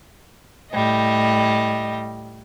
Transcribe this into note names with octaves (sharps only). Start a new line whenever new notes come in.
A2 G3 D#5